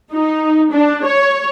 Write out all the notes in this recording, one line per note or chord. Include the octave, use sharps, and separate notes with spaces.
D#4
D4
C#5